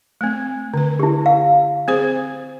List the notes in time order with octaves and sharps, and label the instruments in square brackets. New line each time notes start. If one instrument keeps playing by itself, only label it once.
[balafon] A3 C4
D3 B4
[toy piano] E4 G4
F5
[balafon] C4 G#4 C5